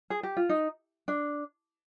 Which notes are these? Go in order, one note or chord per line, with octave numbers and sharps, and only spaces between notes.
G#4
G4
F4
D#4
D4